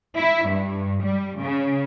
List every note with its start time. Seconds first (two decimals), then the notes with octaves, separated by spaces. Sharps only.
0.18 E4
0.48 G2
1.03 G3
1.41 C#3